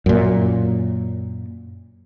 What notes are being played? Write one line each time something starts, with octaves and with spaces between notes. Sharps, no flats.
F#2 A#2